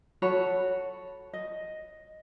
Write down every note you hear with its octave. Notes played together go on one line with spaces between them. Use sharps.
F#4 A4 C#5 B5
D#5